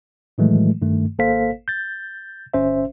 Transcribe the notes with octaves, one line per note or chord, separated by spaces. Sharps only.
A2 D#3 E3 F#3 G#3 A3
G2 D#3 A3
G#1 A#3 A4 C5 F5 B6
G6 A6
G1 C#4 C5 E5